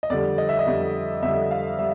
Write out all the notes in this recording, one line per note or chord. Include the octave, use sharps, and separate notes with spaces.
D#5
F2 D3 G3 D5
D#5
E5
D#5
F2 D3 G3
F2 D3 G3 E5
F5
G3 E5